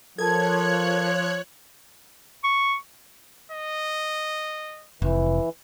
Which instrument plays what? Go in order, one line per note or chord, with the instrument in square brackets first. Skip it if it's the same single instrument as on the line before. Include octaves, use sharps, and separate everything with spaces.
[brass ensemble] F3 [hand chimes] A4 A#4 A5 [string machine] C#5 F#6 [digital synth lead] G#6
[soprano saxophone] C#6
[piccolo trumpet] D#5
[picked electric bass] F1 [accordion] E3